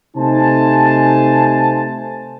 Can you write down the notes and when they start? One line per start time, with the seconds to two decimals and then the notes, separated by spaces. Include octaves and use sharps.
0.17 C3 A3 D#4 C5 G#5 A5